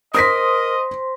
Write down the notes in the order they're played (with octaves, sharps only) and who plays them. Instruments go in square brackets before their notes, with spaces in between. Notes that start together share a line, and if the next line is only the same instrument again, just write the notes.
[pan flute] A#4 [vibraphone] C5 C6 [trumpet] D#5 [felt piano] D#6 A#6 B6